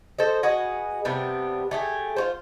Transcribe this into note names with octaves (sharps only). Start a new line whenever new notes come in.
A4 C5 D#5
F#4 G#4 B4 D#5
C3 G3 B3 D4
A3 G4 G#4
F4 F#4 C5